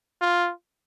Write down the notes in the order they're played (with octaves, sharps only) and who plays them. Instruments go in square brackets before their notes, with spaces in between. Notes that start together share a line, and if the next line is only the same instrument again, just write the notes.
[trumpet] F4